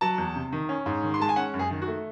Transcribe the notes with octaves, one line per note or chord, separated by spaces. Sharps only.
F#3 A5
E2
C3
D#3
C#4
G#2
D#3
C6
G#3 A5
G#5
C#4 F#5
F#2
G#4
D#3
F#4
A3